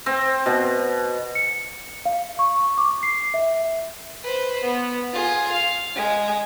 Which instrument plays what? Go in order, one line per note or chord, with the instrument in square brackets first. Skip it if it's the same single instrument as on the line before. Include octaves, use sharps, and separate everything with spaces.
[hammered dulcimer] C4
B2
[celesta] C#7
F5
C#6
D6
C7
E5
[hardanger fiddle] B4 C5
B3
F4 G#4
F5
G#3